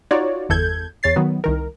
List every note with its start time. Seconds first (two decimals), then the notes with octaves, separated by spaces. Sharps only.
0.11 D#4 F4 F#4 C#5 D5
0.49 G1 E2 A4 G6 G#6
1.03 E2 C#5 A6 C7
1.16 D#3 F#3 B3
1.44 C2 D#3 A#4